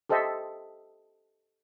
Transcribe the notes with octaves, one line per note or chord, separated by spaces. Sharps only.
G4 A4 C5 D#5 E5